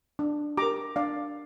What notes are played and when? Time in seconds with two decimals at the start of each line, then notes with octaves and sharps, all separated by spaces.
0.19 D4
0.57 G4 A#4 A#5 D6
0.96 D4 D5 F5